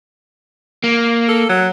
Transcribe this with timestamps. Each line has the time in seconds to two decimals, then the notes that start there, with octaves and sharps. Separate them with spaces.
0.84 A#3
1.28 A4
1.49 F#3